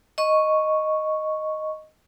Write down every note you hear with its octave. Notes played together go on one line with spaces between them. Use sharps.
D#5 C#6